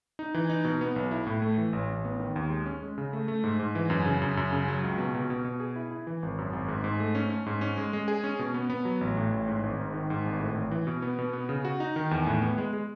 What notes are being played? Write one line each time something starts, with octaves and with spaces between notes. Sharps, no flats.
D#4
E3
D#4
B2
B3
B1
E4
A2
A3
E3
A1
A1
B3
D#3
D#2
G#3
C#4
G#3
C#3
A3
A3
G#2
G#2
E3
F#2
C#3
F#2
F#2
C#3
F#3
C#2
B2
B2
B2
B2
G#4
E4
E4
E3
G#1
F#2
G#1
G#2
G#2
A3
C#4
C#4
G#2
C#4
G#3
G#3
G#4
C#4
B2
B3
B3
F#3
A1
A2
A1
G#2
G#1
G#2
D#3
G#2
G#1
A2
A1
E3
B2
B3
B2
B3
C#3
F#4
D#4
D#3
E2
A2
B3
G#3
G#3